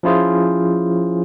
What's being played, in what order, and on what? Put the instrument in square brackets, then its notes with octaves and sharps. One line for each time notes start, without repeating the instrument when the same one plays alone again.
[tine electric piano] F3 C#4 E4 F4 G#4 C5